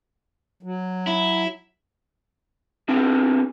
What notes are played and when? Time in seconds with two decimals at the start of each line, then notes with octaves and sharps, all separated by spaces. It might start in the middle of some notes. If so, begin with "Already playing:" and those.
0.63 F#3
1.07 E4
2.89 B3 C4 D4 G4